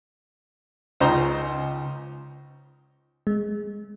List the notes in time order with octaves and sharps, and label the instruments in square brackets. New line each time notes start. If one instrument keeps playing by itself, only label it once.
[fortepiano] C#2 C#3 D#4 C5 A#5
[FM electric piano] G#3